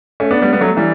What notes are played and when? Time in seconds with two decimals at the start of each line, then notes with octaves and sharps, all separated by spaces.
0.20 A3 C#4
0.31 B3 D4
0.42 G3 B3
0.52 G3 B3
0.61 F#3 A3
0.77 E3 G3